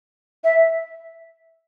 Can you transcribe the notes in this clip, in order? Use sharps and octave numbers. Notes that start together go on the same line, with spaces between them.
E5